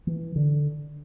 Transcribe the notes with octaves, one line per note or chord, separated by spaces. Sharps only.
E3
D3